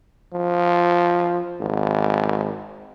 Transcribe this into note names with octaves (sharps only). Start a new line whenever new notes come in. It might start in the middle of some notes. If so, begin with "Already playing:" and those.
F3
G#1